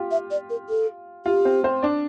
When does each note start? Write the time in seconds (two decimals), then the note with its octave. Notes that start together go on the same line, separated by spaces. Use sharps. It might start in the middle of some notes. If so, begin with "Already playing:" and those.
Already playing: F4 G4
0.11 E5
0.31 D5
0.50 A#4
0.69 A4
1.26 F4 G4
1.45 C4 C5
1.64 C4 C5
1.83 D4 D5